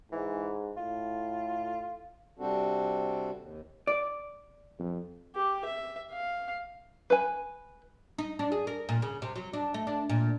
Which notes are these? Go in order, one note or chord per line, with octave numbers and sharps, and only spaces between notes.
G#2 E3
A2 F4
C3 G3 C4 D4 F#4 A4
D#2
D5
F2
G4
E5
F5
B4 G#5
D#4
D4
G#4
A#4
A#2
C#3
C3
F#3
D4
A3
D4
A#2